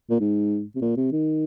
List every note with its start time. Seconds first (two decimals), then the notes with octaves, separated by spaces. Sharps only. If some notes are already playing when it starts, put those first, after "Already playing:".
0.10 A#2
0.20 G#2
0.76 C3
0.81 A#2
0.97 C3
1.12 D#3